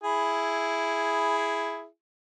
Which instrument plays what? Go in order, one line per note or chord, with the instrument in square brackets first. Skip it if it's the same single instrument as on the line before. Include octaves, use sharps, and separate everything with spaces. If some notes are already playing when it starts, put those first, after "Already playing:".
[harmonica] E4 G#4